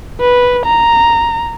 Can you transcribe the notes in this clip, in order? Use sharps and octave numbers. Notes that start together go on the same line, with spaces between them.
B4
A#5